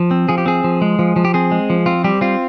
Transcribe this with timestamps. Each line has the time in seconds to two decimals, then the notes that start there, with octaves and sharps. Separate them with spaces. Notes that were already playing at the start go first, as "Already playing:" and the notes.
Already playing: F3
0.11 C4
0.29 F3 G#4
0.38 G4
0.46 C4 G#4
0.64 F3
0.82 G#3
0.99 F3
1.16 F3
1.25 G4
1.34 C4 G#4
1.51 G#3
1.70 F3
1.86 C4 F4
2.04 G3 G4
2.21 C4 F4